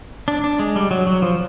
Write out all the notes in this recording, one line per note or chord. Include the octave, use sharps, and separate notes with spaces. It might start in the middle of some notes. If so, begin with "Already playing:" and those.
D4
D4
G#3
G3
F#3
F#3
F3